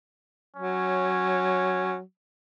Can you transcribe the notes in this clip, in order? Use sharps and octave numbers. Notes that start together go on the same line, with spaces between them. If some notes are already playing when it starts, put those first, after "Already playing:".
F#3 C#4